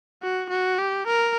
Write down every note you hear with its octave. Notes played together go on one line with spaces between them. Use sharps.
F#4
F#4
G4
A#4